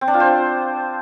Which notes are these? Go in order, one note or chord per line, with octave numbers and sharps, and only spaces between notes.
C4
D4
F4
C5